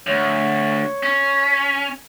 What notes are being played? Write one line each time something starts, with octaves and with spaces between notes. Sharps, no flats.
D2 C#5
C#4